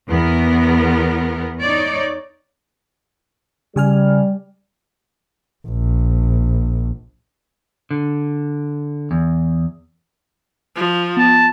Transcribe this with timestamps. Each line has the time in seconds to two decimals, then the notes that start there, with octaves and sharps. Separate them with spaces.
0.11 E2 B3 A#4
1.62 D#4 C#5 D5
3.76 C#3 G3 G#5 F6
5.67 A#1
7.91 D3
9.11 E2
10.76 F3
11.17 B3 A5